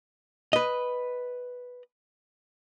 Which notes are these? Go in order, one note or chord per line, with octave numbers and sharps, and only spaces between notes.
B4 D#5